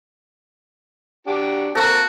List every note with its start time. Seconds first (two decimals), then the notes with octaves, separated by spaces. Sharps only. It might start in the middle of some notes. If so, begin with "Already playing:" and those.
1.27 D4 F#4 G4
1.75 A#3 C4 F#4 A4 C#6